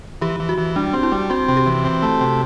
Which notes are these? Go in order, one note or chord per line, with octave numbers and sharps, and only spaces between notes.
E3 G4
E3
F#4
E3
G3 D4
C4
E4
G3
C4 F#4
C3
G4
E3
C4
A3
C3